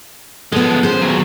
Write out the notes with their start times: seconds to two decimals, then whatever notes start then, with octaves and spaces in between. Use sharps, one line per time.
0.52 F3 G#3 B3 A4
0.83 C#4 G#4 C5
1.02 D#2 F#3